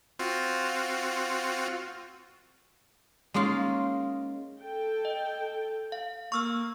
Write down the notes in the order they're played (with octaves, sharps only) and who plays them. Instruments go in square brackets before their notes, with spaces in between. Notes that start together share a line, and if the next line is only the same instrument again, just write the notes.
[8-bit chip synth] C4 F4 F#4
[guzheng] G#3 A#3 C#4 D#4 F4
[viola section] A4 G5
[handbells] D#5
F5
[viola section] A#3 [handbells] C#6 E6 F6